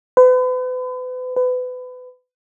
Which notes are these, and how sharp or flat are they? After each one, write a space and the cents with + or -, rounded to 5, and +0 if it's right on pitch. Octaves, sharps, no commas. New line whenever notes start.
B4 +40
B4 +30